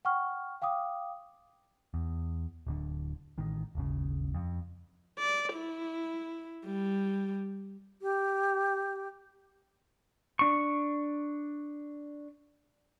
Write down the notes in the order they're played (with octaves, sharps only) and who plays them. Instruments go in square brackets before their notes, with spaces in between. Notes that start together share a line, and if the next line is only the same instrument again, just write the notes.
[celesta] F#5 G5 C#6 F6
F5 G5 D6 D#6
[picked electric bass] E2
D1 D3
A1 D#3
D#1 G#1 C#3
F2
[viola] D5
E4
G3
[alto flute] G4
[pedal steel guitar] D4 C#6